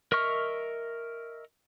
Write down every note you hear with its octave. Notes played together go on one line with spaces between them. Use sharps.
A#4 D#5 E5 C#6 F6